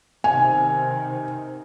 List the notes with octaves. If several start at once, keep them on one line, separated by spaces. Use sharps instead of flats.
C3 D#3 G#5